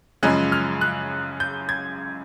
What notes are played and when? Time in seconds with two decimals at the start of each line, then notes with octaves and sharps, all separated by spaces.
0.23 F#2 C#3 F3 G#3 C#4 F#6
0.52 F6
0.81 F#6
1.40 G6
1.69 G#6